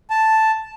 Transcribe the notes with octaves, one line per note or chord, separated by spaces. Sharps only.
A5